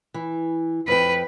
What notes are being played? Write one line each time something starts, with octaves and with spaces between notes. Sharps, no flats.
E3
F2 B4 G5